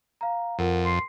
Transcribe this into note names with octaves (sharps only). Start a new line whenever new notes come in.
F5 A#5
F2 F4 A#4 F#5
C6 C7